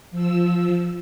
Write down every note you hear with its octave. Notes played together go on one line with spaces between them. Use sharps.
F3 E6